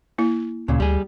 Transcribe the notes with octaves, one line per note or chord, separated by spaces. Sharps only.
A#3 E4
D2 A#2 C#3
D2 G3 G#4